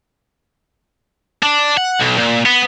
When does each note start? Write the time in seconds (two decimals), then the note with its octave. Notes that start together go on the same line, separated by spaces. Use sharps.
1.43 D4
1.77 F#5
2.00 B1
2.19 A#2
2.46 B3